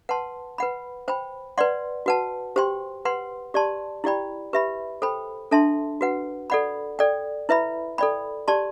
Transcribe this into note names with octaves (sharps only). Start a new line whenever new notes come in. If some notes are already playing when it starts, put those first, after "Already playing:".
B4 F#5 A5 C6
B4 F#5 B5
C5 G5 B5
B4 D5 F#5 C6
F#4 B4 F#5 A5
G4 C5 G5 C6
B4 F#5 C6
G4 D5 A5 C6
E4 G4 D5 G5 B5
G4 B4 E5 B5
A4 C5 G5 B5
D4 A4 E5 A5 C6
F#4 B4 F#5
A4 D5 F#5 B5
A4 D5 G5
E4 B4 E5 B5
A4 D5 G5 B5
G4 D5 A5 C6